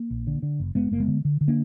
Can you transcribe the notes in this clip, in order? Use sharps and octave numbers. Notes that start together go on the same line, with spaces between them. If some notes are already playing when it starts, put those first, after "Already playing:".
Already playing: A#3
A#1
D3
D3
F#1
F#1 G#3 B3
F#1 A#3
G#3 B3
D3
D3
D3
A#3 D4